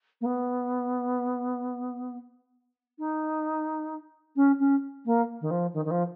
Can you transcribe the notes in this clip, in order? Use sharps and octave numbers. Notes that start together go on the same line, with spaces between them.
A#3
B3
D#4
C#4
C#4
A#3
D#3
F3
D#3
D#3
F3